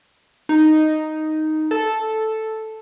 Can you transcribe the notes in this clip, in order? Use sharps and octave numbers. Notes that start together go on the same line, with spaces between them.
D#4
A4